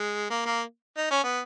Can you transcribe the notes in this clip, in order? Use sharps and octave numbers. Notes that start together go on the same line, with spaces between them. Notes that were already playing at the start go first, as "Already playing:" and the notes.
Already playing: G#3
A#3
A#3
D#4
C#4
B3